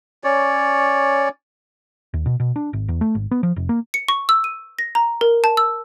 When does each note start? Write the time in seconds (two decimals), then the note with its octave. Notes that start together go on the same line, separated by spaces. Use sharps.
0.24 C#4 C#5 D5
2.14 D#2
2.26 B2
2.40 B2
2.56 D4
2.73 G#1
2.88 E2
3.01 A3
3.15 G#1
3.31 B3
3.43 F3
3.56 F1
3.69 A#3
3.94 C#7
4.08 C#6
4.29 E6
4.44 D#7
4.79 A#6
4.95 A#5
5.21 A#4
5.44 A5
5.57 E6